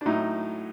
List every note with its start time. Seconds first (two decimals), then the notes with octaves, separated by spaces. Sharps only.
0.01 D4
0.05 A2 F#3 A3 D#4